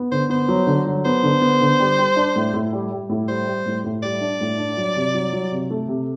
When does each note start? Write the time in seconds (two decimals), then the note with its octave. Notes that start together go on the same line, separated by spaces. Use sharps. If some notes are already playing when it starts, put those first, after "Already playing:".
Already playing: B3
0.12 D3 C5
0.30 B3 C5
0.48 F#3
0.67 D3
0.87 F#3
1.05 B3 C5
1.23 D3
1.41 B3
1.61 D3
1.80 G3
1.98 G3
2.16 D4
2.36 A2
2.54 A2
2.73 G3
2.91 G3
3.09 A2
3.28 G3 C5
3.47 G3
3.66 A2
3.84 A2
4.02 G3 D5
4.21 D4
4.41 A2
4.58 D4
4.77 F#3
4.96 C3
5.14 F#3
5.33 F#3
5.52 C3
5.70 A3
5.88 C3